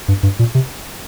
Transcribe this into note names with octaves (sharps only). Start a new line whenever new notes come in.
G2
G2
A#2
C3